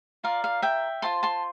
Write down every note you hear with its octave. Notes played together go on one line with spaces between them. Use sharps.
F4 A#4 D5 F5
F5
E5 G5
F4 C5 A5 C6
A5 C6